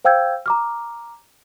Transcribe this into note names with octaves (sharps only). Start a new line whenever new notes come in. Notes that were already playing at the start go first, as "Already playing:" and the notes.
C5 F5 G5 E6 G6 G#6
A#5 D6 F6